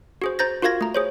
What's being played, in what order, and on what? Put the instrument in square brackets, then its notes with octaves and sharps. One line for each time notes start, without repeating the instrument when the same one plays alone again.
[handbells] F#4 G#4 C5
C5 A#5 G6 A6 A#6
F4 F#4 A#4 F5 G#6 A#6
A3 A#5
G#4 C5 C#5